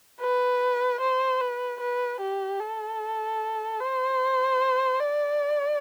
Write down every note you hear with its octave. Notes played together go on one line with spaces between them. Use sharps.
B4
C5
B4
B4
G4
A4
C5
D5